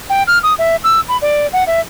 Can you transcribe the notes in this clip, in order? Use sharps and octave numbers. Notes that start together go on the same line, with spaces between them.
G5
F6
D#6
E5
E6
B5
D5
F#5
E5